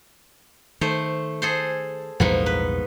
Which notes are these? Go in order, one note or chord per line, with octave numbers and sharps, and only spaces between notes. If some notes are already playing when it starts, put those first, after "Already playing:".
D#3 A3 C5
G#4 A4 C5
A#1 E2 G#2 G3 A#3 B3
B4